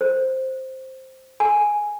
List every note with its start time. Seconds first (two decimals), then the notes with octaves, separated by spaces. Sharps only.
0.01 C5
1.40 G#5